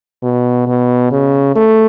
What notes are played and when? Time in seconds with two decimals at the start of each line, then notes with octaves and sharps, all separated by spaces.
0.23 B2
0.67 B2
1.12 C#3
1.56 A3